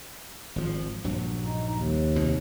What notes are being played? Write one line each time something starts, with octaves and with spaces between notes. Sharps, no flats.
G#1 F3
A#1 G2 F#3
D#4
D#2
C2 B2 D#3